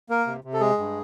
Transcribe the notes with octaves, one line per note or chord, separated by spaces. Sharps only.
A#3 A#4
C3
C3
A4
G#3 G#4
G2